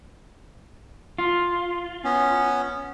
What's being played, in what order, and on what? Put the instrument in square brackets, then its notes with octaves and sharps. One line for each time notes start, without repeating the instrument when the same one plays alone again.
[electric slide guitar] F4
[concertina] B3 C#4